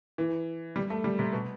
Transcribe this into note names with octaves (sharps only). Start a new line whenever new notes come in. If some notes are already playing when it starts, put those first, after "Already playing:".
E3
G3
A3
G3
C3
B2